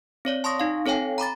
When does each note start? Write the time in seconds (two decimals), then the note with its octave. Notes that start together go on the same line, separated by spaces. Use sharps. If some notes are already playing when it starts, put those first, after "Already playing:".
0.25 C4 C#5 D5
0.44 A5 C6 C#6 D#6 A#6
0.60 D#4 F5
0.86 C4 A4 C#5 F5 G5 G#5
1.18 A#5 B5 D6 A6